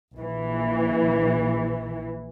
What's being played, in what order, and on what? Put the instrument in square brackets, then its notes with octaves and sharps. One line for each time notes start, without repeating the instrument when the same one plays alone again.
[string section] A#1 E3